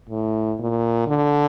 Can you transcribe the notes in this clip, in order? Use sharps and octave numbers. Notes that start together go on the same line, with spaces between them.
A2
A#2
D3